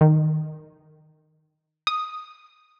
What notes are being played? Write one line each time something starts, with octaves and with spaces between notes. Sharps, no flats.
D#3
D#6